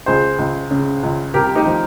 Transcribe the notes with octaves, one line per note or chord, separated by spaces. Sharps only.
C#2 G#4 C5
C#2
C#3
C#2
C2 G4 A#4
D#4 G4
F3